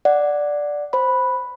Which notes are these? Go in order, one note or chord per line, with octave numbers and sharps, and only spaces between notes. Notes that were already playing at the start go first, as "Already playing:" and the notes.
D5 F#5
C5 B5